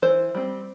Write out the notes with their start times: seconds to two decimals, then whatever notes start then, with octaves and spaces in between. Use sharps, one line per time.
0.02 E3 C5
0.35 G3 C4